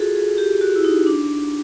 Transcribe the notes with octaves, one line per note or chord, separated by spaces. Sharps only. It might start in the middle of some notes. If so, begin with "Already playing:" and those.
Already playing: F4 F#4 G#4 A4
G#4
G4
F#4
E4
D#4
D4